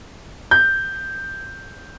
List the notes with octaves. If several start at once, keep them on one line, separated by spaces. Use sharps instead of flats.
G6